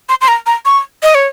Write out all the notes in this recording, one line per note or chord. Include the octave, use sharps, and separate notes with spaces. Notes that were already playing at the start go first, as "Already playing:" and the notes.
C6
C6
A#5
A#5
C#6
D#5
C#5